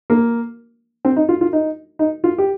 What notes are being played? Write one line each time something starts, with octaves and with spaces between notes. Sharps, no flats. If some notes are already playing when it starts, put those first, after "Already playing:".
A#3
C4
D#4
F4
F4
D#4
D#4
F4
G4